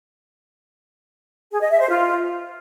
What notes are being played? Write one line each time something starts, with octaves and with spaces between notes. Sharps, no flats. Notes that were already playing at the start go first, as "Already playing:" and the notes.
G#4
D#5
E5
C5
F4